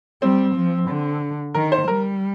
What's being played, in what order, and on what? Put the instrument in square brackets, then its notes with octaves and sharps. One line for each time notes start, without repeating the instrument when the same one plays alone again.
[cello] G3 [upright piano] C4
[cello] F3
D3
[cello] D#3 [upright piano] A#4
[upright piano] C5
[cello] G3 [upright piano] A#4